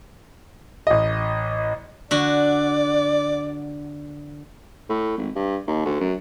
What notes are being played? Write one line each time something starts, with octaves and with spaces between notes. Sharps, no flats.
A1 D#5
D3 F#4 D5
A2
G#1
G2
D#2
D2
F#2